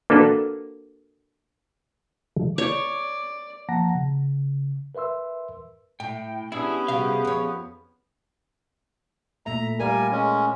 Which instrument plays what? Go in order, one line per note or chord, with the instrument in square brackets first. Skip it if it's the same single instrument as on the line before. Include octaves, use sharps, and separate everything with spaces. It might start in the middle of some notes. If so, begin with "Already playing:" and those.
[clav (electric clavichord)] A#3 D4 F#4 A4 B4
[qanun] C#5 [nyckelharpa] D5
[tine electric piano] F3 A#3 F#5 A5 A#5 A#6
C#3
A#4 B4 E5 C6 E6
[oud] A2 [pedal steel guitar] G5
[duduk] B3 [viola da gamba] C#4 G4 [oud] D4 [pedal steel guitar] E4 G#4 E6
[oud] C3 G3 F#4 [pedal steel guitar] G#4 F5
[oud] F2 C#5
[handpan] A#2 A3 E5 [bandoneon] A#5
[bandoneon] G3 G#5 [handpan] A#4 D5 F5
[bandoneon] G#3 C#4